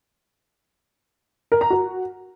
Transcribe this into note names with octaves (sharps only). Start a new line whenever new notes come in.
A#4
A#5
F#4